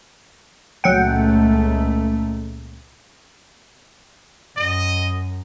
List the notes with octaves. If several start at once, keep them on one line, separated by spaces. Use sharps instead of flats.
C#2 A#2 F#3 A3 F#5 G5
F#2 D#5